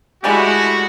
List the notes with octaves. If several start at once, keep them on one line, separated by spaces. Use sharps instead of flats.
G#3 A3 E4 F#4 G4 D5 D#5 G#5